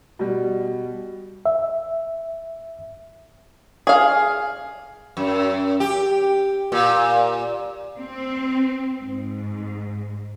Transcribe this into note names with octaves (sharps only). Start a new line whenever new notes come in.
B2 G3
E5
G#4 F5
F#2
G4
A#2
C4
G#2